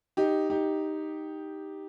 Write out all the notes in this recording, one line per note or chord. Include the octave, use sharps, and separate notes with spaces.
D#4 G4
D#4 G4